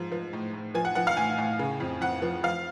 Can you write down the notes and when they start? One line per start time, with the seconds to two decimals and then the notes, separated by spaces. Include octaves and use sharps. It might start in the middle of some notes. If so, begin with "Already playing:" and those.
Already playing: G#2 F3
0.12 F3
0.33 A2
0.53 A2
0.75 F3 G#5
0.85 F#5
0.95 F3 F#5
1.07 F5
1.17 A2 G#5
1.38 A2
1.59 C#3
1.80 F2
2.01 F2 F#5
2.22 F3
2.43 F3 F5